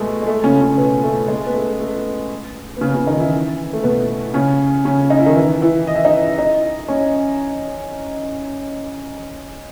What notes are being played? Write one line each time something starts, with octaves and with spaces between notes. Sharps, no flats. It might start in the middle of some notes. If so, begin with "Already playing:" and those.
Already playing: B2 G#3 A3 B3
G#3
A3
C#3 C#4
C#3 C#4
B2 B3
A3
G#3
B3
A3
A3
B3
C#3 C#4
B3
C#3 C#4
D#3 D#4
E3 E4
A3
B2 B3
C#3 C#4
C#3 C#4
D#4
E4
D#3 D#4
E3 E4
E3 E4
D#5
E5
D#4 D#5
D#4 D#5
C#4 C#5